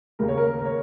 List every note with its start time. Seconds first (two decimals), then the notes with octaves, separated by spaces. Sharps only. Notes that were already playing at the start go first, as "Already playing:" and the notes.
0.19 D#2 C#3 A#3 A#4
0.28 C#5
0.38 A#4
0.59 A#4
0.65 C#5